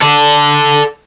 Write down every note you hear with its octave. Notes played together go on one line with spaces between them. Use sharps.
A4 D5